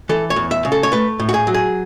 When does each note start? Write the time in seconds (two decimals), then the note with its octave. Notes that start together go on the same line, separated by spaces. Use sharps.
0.09 E3 A4
0.30 C#5
0.36 E2
0.51 E5
0.65 C#3
0.72 A4
0.83 C#5
0.92 A3 B4
1.19 A2
1.29 F#4
1.34 G#4
1.47 F#3
1.54 G#4